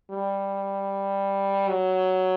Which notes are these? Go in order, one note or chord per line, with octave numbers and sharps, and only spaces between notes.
G3
F#3